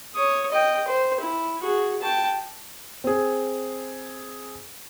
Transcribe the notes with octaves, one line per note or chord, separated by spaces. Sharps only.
C#5 D#6
D#5 G5
C5
E4
F#4 G#4
G5 A5
C4 G#4